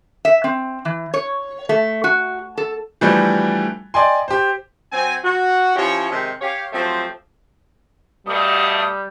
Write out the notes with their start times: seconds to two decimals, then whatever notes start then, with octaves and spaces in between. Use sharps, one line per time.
0.25 E5
0.44 C4
0.85 E3
1.14 C#5
1.69 A3
2.04 F#4
2.58 A4
3.01 E3 F3 G3 A3 D4 F#4
3.94 D5 D#5 G5 G#5 C6
4.28 G4 C5
4.92 F#3 C4 G#5
5.24 F#4
5.76 F3 C#4 E4 G4 C#5
6.11 C3 D#3 G#3
6.42 G4 C#5 F5
6.73 F3 F#3 A3 C4 G4 C5
8.27 G2 B2 G3 A3 D#6